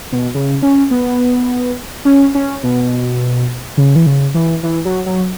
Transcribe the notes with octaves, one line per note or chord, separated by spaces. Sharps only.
B2
C#3
C#4
B3
C#4
C#4
B2
C#3
E3
C#3
E3
E3
F#3
F#3